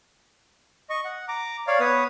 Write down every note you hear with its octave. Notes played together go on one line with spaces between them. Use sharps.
D#5 C#6
F#5
A#5 D6
C#5 D5 F5
B3 B4 C#5 D#6